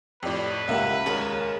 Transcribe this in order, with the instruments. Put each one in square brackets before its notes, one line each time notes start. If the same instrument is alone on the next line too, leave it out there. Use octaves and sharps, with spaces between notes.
[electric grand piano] F2 A2 [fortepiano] G4 D5 [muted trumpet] B4
[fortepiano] C#2 A#3 G4 [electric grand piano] D#5 E5 F#5
[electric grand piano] D#2 G#3 [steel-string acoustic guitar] C#4 G#4 A#4